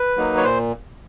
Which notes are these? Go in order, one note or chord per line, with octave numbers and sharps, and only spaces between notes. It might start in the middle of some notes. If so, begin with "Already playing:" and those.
Already playing: B4
F#3 A#3 D#4
C#5
A#2 C5